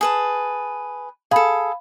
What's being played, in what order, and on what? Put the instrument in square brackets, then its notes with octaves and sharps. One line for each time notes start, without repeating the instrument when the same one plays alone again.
[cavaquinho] G#4 B4 A5
[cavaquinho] G#4 A4 [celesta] F5 B5